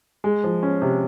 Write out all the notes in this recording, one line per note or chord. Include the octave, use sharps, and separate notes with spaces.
G#3
F3
C#4
C3